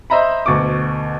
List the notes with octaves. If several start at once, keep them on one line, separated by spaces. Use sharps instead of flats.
C5 D#5 E5 A#5 B5
D2 B2 C#6 D6